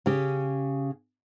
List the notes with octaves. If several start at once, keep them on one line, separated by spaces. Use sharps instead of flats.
C#3 C#4 G4